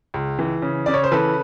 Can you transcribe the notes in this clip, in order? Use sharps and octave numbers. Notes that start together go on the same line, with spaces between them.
C#2
E3
C#3
C#3 D5
C#5
C5
E3 A4 B4